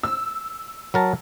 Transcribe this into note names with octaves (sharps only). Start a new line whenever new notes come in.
E6
F#3 A#4 A5